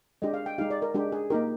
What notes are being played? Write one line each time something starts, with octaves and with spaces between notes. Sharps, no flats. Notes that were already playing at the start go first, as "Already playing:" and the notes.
G#3 D4 G4 D#5
F5
G5
G#3 D#4 G4 F5
D5
A#4
G#3 D4 G4
G#4
A#3 D#4 G4 A#4